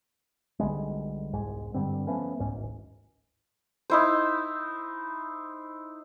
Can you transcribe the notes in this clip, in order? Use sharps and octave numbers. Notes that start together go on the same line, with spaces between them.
B1 D3 G3 G#3
E1 C2 G#2 G#3
G2 D3 G3 C4
F3 A3 B3 C#4
C2 G#2 C#4
D1 G#1
D#4 E4 C5